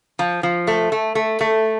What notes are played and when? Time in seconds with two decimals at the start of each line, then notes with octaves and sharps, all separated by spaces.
0.19 F3
0.43 F3
0.67 A3
0.92 A3
1.15 A3
1.41 A3